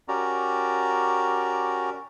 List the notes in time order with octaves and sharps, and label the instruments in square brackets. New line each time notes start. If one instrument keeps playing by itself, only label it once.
[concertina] C#4 F#4 G4 A#4 D5 A#5